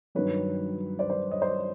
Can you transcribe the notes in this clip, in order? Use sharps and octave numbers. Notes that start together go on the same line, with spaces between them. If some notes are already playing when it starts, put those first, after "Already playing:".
G2 D#3 F#3 B4 C#5
C5 D5
C5 D5
C#5 D#5
C5 D5